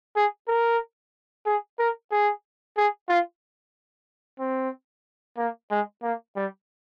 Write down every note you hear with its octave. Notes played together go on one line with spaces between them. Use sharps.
G#4
A#4
G#4
A#4
G#4
G#4
F4
C4
A#3
G#3
A#3
G3